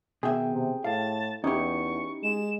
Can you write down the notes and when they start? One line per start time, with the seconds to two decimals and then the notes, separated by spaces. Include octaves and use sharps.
0.23 B2 D#3 G#4 E5 G5
0.52 C3
0.84 A2 F5 A5
1.44 E2 C#4 D#4 E4 G4 C#6
2.23 G#3 E7